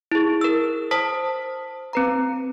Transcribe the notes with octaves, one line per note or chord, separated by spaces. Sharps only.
E4 G#4
A#4 E6
C5 A5 D#6 B6
C4 B4 A#5